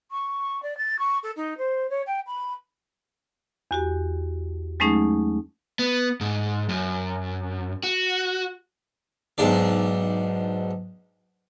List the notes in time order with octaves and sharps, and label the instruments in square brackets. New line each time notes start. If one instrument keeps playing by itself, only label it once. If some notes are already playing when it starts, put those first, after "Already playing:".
[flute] C#6
D5
A6
C#6
A4
D#4
C5
C#5
G5
B5
[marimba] E2 F#4 G4
F#3 G#3 A3 C#4 D#4 G#4
[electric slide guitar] B3
G#2
F#2
F#4
[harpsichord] B1 G#2 D4 D5